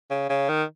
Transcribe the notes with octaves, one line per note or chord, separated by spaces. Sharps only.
C#3
C#3
D#3